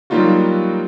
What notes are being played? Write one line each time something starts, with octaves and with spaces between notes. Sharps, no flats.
F#3 G3 A#3 D#4 F4 F#4